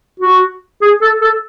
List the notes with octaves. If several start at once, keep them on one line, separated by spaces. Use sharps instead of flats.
F#4
G#4
A4
A4